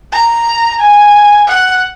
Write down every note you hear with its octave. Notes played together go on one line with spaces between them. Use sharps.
A#5
G#5
F#5